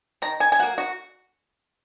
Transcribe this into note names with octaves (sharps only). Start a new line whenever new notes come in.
D#3 A#5
G#5
G#5
F#3 A#3 F#5
F#4